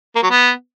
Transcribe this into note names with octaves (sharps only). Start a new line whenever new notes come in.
A#3
F#3
B3